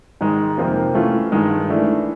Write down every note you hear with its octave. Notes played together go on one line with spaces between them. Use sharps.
G#2 D#3 G#3
F2 C3 F3 A#3
E3 A3 C#4 F4
G2 D#3 G#3
E3 A3 D4